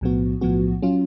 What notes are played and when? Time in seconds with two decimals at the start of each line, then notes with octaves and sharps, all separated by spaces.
0.01 B1 A2 F3 B3 F#4
0.41 B1 A2 F3 B3 F#4
0.82 F#3 C#4 F4